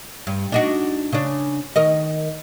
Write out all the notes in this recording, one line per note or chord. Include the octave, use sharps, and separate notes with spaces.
G2
D4 D#4 F#4
C#3 D4
D#3 A#4 D#5